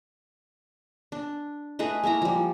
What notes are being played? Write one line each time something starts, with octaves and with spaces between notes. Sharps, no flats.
D4
A3 G#4 B4 D#5
G#3 A#3 E4 A#5
F3 G3